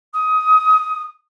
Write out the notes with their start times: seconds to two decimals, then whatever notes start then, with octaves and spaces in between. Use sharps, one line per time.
0.13 D#6